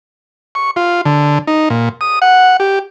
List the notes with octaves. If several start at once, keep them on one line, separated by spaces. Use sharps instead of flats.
C#6
F4
D3
D#4
A#2
D#6
F#5
G4